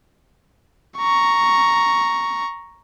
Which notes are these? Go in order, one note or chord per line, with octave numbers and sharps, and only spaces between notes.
A#5 C#6